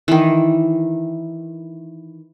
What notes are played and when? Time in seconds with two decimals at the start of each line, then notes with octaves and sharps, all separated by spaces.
0.08 D#3 E3